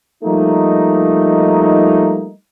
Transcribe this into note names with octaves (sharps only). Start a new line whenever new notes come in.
F3 G3 A3 A#3 D#4